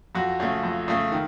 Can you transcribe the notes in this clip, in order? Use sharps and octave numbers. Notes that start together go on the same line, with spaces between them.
F2 F#4
C#3 A3
F2
C#3 A3
D#3